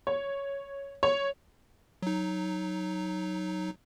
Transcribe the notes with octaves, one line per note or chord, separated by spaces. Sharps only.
C#5
C#5
F#3 D#4